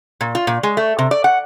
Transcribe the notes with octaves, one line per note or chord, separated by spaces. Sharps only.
A#2
F4
A#2
G#3
A3
C3
D5
F#5